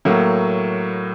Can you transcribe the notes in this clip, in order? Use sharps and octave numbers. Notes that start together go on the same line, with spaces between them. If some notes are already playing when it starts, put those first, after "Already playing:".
A2 F#3 A#3